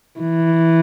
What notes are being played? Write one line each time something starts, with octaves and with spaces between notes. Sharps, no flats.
E3